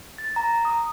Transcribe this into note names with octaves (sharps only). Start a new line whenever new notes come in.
A6
A#5
D#6